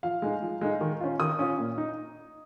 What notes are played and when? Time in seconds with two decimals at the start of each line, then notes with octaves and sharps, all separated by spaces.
0.03 F3 F5
0.22 G#3 D#4
0.42 F3
0.61 G#3 D#4
0.81 D#3
1.00 C#4 F4
1.20 D#3 D#6
1.39 C#4 F4
1.58 A#2
1.78 D#4